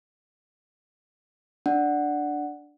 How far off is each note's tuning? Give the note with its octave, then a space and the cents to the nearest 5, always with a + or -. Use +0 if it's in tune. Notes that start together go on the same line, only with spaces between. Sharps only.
D4 +0 F#5 +0